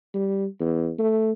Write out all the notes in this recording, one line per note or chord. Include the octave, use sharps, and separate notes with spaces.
G3
E2
A3